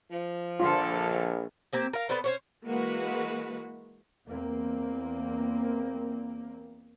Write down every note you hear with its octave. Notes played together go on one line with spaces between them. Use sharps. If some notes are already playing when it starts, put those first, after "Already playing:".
F3
A#1 D3 F4 A4
A#3 C4 G4
A#4 F5
B3 A4 C5 D5
C#4 C5 C#5
E3 G#3 A#3 F#4 B4
E2 A#3 C4